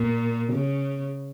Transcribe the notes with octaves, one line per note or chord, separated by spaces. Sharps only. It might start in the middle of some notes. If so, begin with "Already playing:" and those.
Already playing: A#2
C#3